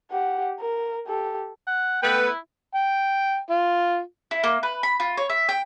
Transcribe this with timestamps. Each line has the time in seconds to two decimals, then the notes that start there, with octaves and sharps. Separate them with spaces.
0.11 G4 F#5
0.61 A#4
1.07 G4 A4
1.67 F#5
2.02 A3 B3 B4 G5
2.27 E4
2.75 G5
3.50 F4
4.31 E4
4.44 A#3
4.63 B4
4.83 B5
5.00 F4
5.17 C#5
5.30 E5
5.49 G5